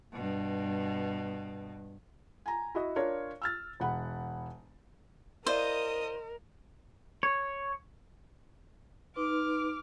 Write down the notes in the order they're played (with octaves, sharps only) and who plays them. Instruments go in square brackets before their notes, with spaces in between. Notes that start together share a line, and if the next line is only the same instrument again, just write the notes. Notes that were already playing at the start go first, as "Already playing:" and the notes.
[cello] G2 B2
[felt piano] G#5 A#5
E4 F#4 D#5
D4 F4 A#4 C#5
E6 F6 A6
E1 F#5 B5
[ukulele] E4 D5 F5 [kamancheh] A#4 [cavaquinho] C5 [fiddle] D#5 D#6
[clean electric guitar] C#5
[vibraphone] D#4 B4 C6 [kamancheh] D6 F6